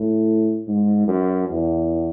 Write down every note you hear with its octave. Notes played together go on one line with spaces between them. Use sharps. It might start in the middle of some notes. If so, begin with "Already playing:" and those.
Already playing: A2
G#2
F#2
E2